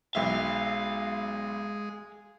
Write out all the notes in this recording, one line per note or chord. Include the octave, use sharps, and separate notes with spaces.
B1 G#3 E5 F5